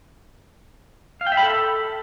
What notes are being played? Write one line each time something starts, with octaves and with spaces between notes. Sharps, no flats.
F5
G5
E5
B5
A4